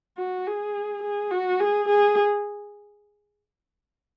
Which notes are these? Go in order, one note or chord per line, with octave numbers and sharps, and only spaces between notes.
F#4
G#4
G#4
F#4
G#4
G#4